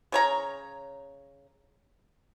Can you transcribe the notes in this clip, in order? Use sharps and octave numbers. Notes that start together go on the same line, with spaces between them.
C#3 C#5 A#5